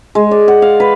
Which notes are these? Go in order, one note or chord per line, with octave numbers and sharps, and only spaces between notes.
G#3
D5
F#5
F5
B4